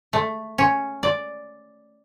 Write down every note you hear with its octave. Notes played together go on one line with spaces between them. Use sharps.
A3
C#4
D5